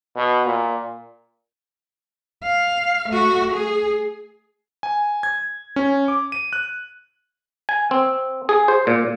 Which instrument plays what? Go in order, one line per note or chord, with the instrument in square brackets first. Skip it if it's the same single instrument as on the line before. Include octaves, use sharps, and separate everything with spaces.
[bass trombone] B2
A#2
[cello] F5
A3 F#4
G#4
[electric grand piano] G#5
G#6
C#4
D6
D#7
F#6
[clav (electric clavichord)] G#5
C4
G#4
C5
A#2